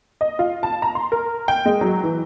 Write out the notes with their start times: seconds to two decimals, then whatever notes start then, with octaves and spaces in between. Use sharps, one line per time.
0.21 D#5
0.39 F4
0.63 A5
0.82 A#5
0.95 C6
1.12 A#4
1.48 G5
1.65 G#3
1.81 F#3
2.03 E3